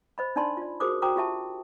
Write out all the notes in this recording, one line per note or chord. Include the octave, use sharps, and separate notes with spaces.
C5 D#5 B5
D4 D#4 D5 A5 B5 C6
F4 D5
F#4 G#4 A#4 C5 D6 D#6
F#4 C5 G5 A#5 D6 D#6
F4 G4 E5 A5